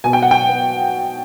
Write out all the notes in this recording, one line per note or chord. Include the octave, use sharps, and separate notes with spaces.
B2 G#5
G5
F#5
G5
B3